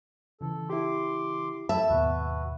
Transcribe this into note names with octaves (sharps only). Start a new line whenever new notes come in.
C#3 E3 A4
E4 G4 C6 D6
E4 A4 E5 A5 E6
D#2 G#2 B2 F#4 B4